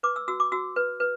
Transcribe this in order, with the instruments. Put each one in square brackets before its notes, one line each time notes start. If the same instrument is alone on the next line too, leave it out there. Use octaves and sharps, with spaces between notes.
[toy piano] B4 D6
E6
F#4 E6
D6
F#4 E6
B4
B4